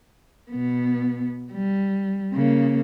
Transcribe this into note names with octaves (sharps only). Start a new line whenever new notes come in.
B2 B3
G3
C#3 A#3